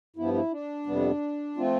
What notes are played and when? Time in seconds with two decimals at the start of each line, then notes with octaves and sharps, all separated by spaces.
0.16 G2 F3 B3 E4
0.34 E4
0.52 D4
0.86 F2 C3 G3 B3
1.57 F3 A3 C4 F4